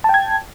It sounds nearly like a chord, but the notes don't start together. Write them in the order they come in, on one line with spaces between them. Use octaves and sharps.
A5 G5 G#6